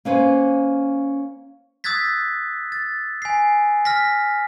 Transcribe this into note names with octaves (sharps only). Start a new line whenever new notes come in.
A#3 C#4 B4 C5
D#6 E6 F#6 G#6 A6 B6
A6
G#5 C7
F6 A#6 B6